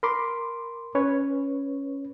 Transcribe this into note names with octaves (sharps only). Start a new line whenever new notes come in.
A#4 B5 C6 D6
C#4 B4 C#5